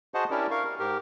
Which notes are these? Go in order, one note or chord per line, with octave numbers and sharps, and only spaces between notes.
F#4 G#4 C5 D#5 F#5 A5
C#4 D4 E4 G4 A#4 D5
A#4 F5 C#6
A#4
G#2 G4 A#4